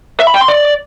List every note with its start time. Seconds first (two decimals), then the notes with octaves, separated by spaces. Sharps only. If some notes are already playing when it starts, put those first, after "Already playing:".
0.20 E5
0.27 B5
0.34 G5
0.41 C6
0.48 D5